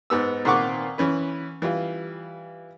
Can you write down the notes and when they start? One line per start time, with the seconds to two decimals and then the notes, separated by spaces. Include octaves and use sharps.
0.10 G#2 B3 E6
0.45 A#2 D#3 C4 F#5 C#6 D6
0.98 E3 C#4 B4
1.62 E3 G3 F4